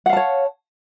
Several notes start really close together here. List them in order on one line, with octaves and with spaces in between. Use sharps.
F#5 F5 A5 C#5